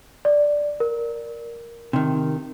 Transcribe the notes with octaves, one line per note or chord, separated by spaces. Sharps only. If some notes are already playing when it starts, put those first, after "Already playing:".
D5
A#4
C3 D#3